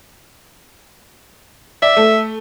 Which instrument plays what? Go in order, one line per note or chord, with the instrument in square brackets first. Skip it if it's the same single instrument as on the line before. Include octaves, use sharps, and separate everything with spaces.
[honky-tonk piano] D5 [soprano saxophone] E5
[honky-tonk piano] A3